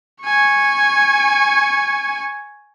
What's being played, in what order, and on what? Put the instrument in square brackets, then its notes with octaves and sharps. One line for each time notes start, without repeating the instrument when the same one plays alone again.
[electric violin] G#5 C#6